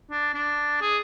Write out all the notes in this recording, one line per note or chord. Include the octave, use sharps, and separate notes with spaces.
D4
D4
G#4